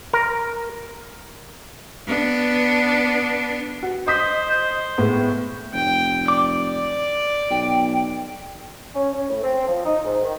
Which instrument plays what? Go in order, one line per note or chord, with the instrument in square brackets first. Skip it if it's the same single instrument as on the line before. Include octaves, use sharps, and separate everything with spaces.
[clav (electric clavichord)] A#4
[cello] B3 D4
[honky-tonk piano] F#4
[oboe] C5 [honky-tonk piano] D#5 D#6 B6
[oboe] C5
[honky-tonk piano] A2 G#3 B3
[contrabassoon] F1 [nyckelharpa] G5
[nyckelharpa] D5 [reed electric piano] D6
[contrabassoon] B1 [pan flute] G5
[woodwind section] C#4
C#4
A2
C4
F3
D#4
G#2
D#3